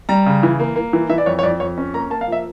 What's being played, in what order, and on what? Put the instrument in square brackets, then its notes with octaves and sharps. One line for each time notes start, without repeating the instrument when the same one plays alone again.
[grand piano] G3 A#5
C#3
E3
A#3
A#3
E3
E3 E5
D5
F2 C#5
C#5
F2 D5
F2 C#5
C#4
A#3 A#5
A#3 A5
F5
F3 E5